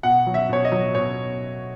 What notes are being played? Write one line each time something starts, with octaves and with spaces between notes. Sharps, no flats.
B2 F#5
F#3
E5
B2 C#5
D#5
F#3
B2 C#5